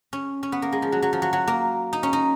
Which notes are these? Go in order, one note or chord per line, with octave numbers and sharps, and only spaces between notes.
C#4
C#4
B3
A#3
G#3
F3
F#3
F#3
F3
F#3
F#3
A#3
D#4
C#4
D#4